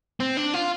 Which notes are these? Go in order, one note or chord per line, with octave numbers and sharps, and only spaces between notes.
C4
D4
F4